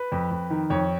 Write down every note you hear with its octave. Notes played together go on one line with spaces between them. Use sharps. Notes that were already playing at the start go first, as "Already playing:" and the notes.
Already playing: B4
F2
F2
D#3
F2 C#5